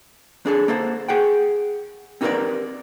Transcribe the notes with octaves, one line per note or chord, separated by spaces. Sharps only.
D4 G#4 A4
A#3 A4 C5
G#4 F#5 G5
C4 D#4 G4 A#4 B4 D5